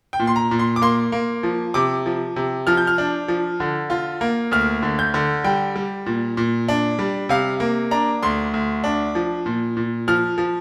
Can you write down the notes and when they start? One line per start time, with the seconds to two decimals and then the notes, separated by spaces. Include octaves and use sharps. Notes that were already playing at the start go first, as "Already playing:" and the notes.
0.13 G5
0.20 A#2
0.27 C6
0.36 A#5
0.51 A#2
0.59 C6
0.76 D6
0.82 A#3 C6
1.12 A#3
1.43 F3
1.74 C3 D6
2.06 F3
2.36 C3
2.67 F3 F6
2.77 G6
2.87 F6
2.98 D4
3.28 F3
3.60 D3
3.90 F4
4.21 A#3
4.51 D2 F6
4.83 D3
4.99 G6
5.14 D3
5.44 G3 G5
5.76 G3
6.06 A#2
6.37 A#2
6.68 D4
6.99 G3
7.29 C3 F5
7.60 A#3
7.91 D4 A#5
8.23 D2 C6
8.54 D2
8.84 D4
9.15 F3
9.46 A#2
9.77 A#2
10.08 F3 F6
10.38 F3